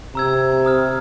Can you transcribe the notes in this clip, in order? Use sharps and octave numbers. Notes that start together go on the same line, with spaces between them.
C3 A#5 E6 G#6
A#5 D#6 F6